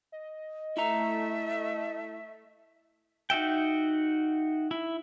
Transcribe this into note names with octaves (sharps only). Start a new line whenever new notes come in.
D#5
A3 E4 E5 A#5
D#4 F#4 E5 G5
E4